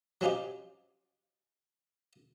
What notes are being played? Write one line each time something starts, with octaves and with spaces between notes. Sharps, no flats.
F#3 C4 C#4 D#4 F4 G4